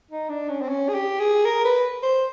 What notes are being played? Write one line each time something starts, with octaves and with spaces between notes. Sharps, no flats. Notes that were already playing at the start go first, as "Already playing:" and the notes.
D#4
D4
C#4
C4
C#4
G#4
G4
G#4
A#4
B4
C5